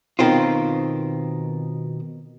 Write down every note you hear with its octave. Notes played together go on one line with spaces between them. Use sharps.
B2 D#3 C4 F4